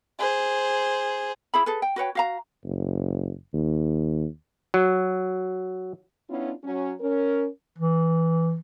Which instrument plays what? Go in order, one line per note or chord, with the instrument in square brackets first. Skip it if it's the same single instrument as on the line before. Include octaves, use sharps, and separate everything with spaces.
[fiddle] G#4 C5
[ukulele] E4 G#4 B5
G#4 A4 B4
G5
F#4 B4 C#5 G5
F#4 F5 A#5
[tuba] F#1
D#2
[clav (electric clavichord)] F#3
[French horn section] B3 C#4 D4 E4 F4
F#3 C#4
C#4 A#4
[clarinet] E3